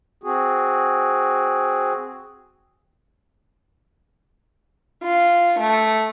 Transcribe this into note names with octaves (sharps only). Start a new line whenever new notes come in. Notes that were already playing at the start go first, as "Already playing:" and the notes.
C4 F#4 G#4
F4
A3